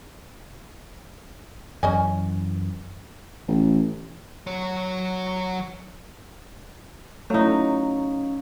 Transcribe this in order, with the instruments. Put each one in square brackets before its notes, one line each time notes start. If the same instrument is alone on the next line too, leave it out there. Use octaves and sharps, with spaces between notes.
[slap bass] F#2 E3 [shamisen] C#4 D#5 G#5
[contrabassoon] A1
[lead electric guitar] F#3 C#5
[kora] F#3 D#4 [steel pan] A3 E4 [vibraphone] C#4 F5